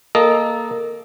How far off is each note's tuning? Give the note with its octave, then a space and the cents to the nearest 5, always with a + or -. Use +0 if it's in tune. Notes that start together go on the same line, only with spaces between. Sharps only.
A#3 -5 A4 -20 D#5 +0